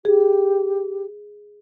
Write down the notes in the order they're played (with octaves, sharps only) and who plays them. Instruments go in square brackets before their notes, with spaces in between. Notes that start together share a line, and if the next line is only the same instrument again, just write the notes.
[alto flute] G4 [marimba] G#4